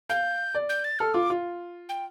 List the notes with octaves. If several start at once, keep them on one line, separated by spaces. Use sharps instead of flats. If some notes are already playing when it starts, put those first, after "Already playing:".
F5 G6
D5
G6
A6
A4 F6
F4 D6
F4
G5